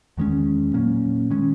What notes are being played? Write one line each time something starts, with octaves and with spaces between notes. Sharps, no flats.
E2 D#3 G#3 C#4
A#2 F#3 A#3 C#4
D#3 G#3 C#4